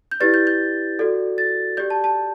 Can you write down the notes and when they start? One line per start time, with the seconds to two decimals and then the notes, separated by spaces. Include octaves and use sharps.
0.11 G6
0.20 E4 G4 B4 D5 A6
0.34 G6
0.47 G6
0.99 F#4 A4 D5
1.38 A6
1.77 G4 D5 G6
1.90 A5
2.04 A5